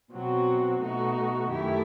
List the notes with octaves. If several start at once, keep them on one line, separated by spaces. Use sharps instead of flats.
B2 F#3 C4 F#4
B2 A3 D#4 F#4
F#2 D#3 A3 E4 G4